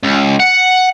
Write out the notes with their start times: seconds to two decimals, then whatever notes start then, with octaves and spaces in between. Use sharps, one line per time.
0.04 C#2
0.40 F#5